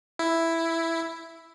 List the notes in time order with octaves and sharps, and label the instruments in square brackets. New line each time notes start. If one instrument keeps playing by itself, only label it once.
[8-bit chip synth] E4